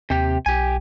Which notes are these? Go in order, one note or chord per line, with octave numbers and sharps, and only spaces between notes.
D#2 C3 G4
B1 G4 G#5